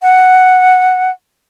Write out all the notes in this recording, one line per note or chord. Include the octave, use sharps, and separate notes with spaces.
F#5